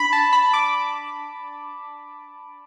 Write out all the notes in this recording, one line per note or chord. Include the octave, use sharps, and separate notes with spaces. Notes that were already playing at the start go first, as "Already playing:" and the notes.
Already playing: D4 B5
A5
B5
D6